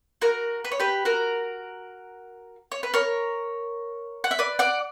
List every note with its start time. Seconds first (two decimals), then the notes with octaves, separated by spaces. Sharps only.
0.22 F#4 A#4
0.65 B4
0.72 C#5
0.80 G4 B4
1.05 F#4 A#4
2.72 C#5
2.83 B4
2.94 A#4 C#5
4.24 F#5
4.31 E5
4.39 B4 D5
4.59 D5 F#5